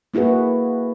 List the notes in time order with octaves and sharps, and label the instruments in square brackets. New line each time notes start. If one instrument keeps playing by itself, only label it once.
[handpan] A#3 E4 F#4 G#4 B4